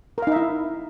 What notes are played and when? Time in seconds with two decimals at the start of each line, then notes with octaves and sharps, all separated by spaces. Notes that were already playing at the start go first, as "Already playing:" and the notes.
0.18 A#4
0.22 F5
0.27 D#4
0.32 E5
0.36 E4